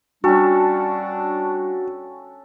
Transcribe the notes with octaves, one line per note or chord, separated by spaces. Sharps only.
G3 C#4 D4 F#4 A4 G5 G#5 C#6